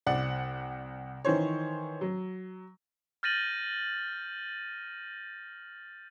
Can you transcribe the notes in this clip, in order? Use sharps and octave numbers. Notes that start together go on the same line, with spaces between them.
C2 D5 F#5
D#3 E3 C5 C#5
F#3
F6 G6 A6 A#6 D#7 F#7